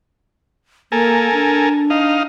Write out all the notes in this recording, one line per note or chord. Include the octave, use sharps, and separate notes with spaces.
A#3 A4 A#4 G#5
D4
D#4 F5